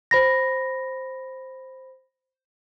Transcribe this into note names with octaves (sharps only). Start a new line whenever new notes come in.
C5 B5 A#6